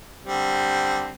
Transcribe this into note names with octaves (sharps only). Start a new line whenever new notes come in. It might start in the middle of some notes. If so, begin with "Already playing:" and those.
D3 G3 C4